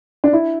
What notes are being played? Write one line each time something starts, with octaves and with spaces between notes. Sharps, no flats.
D4
E4